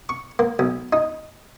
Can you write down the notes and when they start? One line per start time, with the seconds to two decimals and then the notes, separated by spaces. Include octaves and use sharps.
0.09 C#6
0.39 A#3
0.59 B1
0.93 D#4